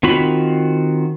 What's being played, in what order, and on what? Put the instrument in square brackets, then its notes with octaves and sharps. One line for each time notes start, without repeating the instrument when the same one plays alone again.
[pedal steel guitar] D#3 C4 F4 F#4 B5